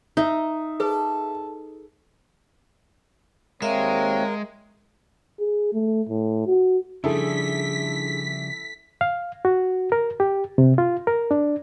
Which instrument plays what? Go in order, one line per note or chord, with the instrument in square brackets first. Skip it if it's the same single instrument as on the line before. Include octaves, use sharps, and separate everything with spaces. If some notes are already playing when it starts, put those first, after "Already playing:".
[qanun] D#4 [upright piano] E5
[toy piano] G#4 B4 [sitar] A4
[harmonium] D#2 C4 C#5 [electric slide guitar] G#3 [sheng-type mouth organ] A#4 [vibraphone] E5 F5
[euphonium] G#4
A3
A2
F#4
[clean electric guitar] C#3 F3 G3 [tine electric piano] D4 G#4 [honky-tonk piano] E4 A4 [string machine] B6
[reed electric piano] F5
F#4
A#4
G4
C3
F4
A#4
D4